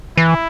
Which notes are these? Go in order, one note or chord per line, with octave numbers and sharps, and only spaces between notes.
E3 E4